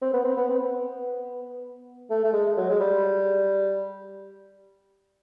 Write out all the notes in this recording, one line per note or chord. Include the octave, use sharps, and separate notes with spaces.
C4
B3
C4
B3
C4
B3
A3
A3
G#3
F#3
G#3
G3